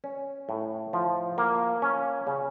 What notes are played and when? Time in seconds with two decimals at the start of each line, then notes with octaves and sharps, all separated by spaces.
0.04 C#4
0.49 A2
0.93 F3
1.38 A#3
1.82 C#4
2.27 C#3